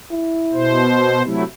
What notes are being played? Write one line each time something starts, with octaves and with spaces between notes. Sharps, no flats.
E4
B2 C5
C3 F#3 A3 E4